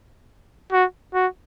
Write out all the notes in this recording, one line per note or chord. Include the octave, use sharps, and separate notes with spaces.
F#4
F#4